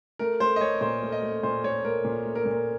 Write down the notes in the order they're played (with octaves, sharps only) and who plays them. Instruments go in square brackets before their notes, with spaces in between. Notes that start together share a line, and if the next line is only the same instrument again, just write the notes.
[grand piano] A3 A#4
A3 C5
D#5
A3 C#5
A#2 C5
A3
D#5
A3
A#2 C5
A3 C#5
A3 A#4
A#2
A3
A#4
A#2
A#4